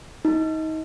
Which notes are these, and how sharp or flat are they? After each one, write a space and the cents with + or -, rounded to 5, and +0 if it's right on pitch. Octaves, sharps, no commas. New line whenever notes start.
D#4 +25